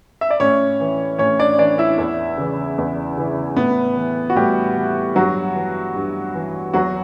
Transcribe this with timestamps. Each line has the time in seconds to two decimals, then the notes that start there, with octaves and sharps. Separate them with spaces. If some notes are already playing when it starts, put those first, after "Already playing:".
0.21 E5
0.30 D5
0.40 A2 C#4 C#5
0.80 E3
1.19 A2 C#4 C#5
1.39 D4 D5
1.58 E3 D4 D5
1.78 E4 E5
1.98 E2
2.37 C#3 E3
2.78 E2
3.17 C#3 E3
3.56 A2 B3 B4
3.96 E3
4.30 F#4
4.36 A2 G3 G4
4.76 E3
5.15 G2 F#3 F#4
5.55 E3
5.94 G2
6.34 E3
6.74 E2 F#3 F#4